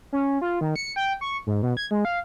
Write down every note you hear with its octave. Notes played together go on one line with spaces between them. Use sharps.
C#4
F4
D#3
C#7
G5
C#6
G#2
B2
G#6
G#3
F5